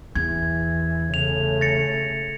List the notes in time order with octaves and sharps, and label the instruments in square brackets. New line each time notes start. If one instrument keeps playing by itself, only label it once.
[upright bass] E2 [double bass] E3 [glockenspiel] G#6
[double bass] C#3 A3 [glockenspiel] F7
[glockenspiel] A6 A#6 C#7